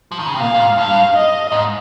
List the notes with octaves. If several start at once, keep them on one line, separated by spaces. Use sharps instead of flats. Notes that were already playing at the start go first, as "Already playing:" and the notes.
F3
D#3
C#3
C3
A#2 F5
A#2
G#2
G2 F5
D#5
G#2